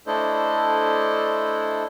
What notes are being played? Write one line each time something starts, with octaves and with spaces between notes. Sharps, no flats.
A3 D4 E4 A4 C5 D#5